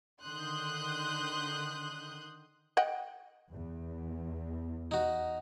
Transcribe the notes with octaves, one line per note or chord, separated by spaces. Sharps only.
D3 D#3 C6 D#6 F#6 G6
D#5 F#5 G5
E2
D#4 F#4